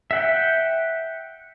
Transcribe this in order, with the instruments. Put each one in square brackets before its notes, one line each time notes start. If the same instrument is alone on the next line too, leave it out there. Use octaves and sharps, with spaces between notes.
[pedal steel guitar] E5 F#5 G5